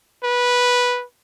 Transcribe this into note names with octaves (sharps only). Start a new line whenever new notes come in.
B4